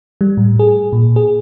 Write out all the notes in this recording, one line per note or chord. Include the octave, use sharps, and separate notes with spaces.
G3
A2
G#4
A#2
G#4